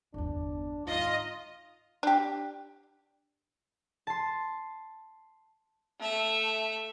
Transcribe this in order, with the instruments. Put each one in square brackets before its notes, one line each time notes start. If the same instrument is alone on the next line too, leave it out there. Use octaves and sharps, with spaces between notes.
[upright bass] G1 E2 [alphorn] D4
[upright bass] G#2 D#3 [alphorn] D#4 [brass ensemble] F4 [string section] D#5
[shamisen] D4 G4
[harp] A5 C6
[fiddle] A3 E5